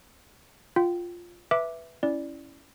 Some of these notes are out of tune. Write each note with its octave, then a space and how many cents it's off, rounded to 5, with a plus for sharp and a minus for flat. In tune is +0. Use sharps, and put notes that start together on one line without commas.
F4 +0 G5 -20
B4 +0 E5 +0 D6 +0
C#4 +0 E4 +0 D5 +0